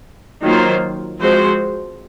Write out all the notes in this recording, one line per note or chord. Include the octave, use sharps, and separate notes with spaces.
D#3 F#3 A#3 F4 C5
F3 G#3 C4 F#4 C5